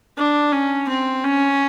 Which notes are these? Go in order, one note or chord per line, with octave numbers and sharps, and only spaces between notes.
D4
C#4
C4
C#4